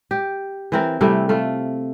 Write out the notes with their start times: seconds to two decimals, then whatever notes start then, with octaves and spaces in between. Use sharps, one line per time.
0.11 G4
0.72 E3 C4 A#4
1.01 C3 E3 G3 A3
1.29 A3 F4